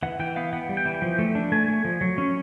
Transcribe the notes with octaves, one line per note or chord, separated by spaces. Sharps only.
E3 F#5
E3 G5
B3 F5
B3 F#5
G3
G5
E3
F3
A3
D4
A3 G#5
A3
F3
F#3
C#4